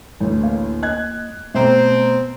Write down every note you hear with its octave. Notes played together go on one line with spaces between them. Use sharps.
A1 D2
A#3
D#5 F#6 G#6
B2 A3 C4 A#5